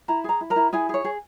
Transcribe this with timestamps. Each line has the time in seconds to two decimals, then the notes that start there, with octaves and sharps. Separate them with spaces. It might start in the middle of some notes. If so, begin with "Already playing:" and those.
0.08 E4 A#5
0.24 G#4 A#5
0.41 E4
0.50 A#4 A#5
0.56 E4
0.73 E4 G#4 G#5
0.89 G#4 C#5
1.05 G#4